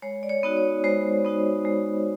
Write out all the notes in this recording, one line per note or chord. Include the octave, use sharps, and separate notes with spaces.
G#3 C#5
D5
C#5
B3 D#4 F#4
C#5
G#3 C5
B3 D#4 F#4
G#3